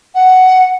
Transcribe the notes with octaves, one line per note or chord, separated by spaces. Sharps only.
F#5